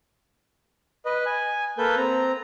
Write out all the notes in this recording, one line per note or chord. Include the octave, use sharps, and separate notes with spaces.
B4 D#5
G#5
A#3 A4 B4 G6
C4 A#5